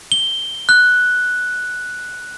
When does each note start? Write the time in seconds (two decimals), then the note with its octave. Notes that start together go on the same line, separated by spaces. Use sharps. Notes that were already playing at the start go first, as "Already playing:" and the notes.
0.12 G7
0.69 F#6